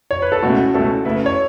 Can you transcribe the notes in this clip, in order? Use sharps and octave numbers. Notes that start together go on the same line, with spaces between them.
C#5
B4
A4
C#2 B2 A3 C#4 E4 F#4
C#2 B2 A3 C#4 E4 A4
C#3 A3 E4 B4
C#5